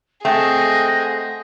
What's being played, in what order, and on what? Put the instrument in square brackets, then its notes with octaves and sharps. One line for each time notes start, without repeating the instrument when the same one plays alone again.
[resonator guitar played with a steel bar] A3 C4 [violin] G#4 [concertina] D#5 F#5 G5 [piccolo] A#6